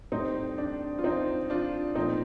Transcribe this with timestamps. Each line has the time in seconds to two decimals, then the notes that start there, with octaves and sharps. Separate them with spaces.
0.12 A2 G3 C4 D#4
0.58 D4
0.99 F4
1.04 C4 D#4
1.50 D4 F4
1.95 A#2 F3 A3 C4 D#4